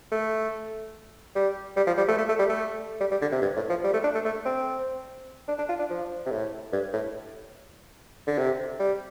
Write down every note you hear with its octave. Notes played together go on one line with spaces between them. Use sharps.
A3
G3
G3
F3
G3
A3
A3
A3
G3
A3
G3
G3
D3
C3
G2
A2
F3
G3
A3
D4
A3
A3
C4
D4
D4
F4
D4
F3
C3
A2
G2
A2
D3
C3
G3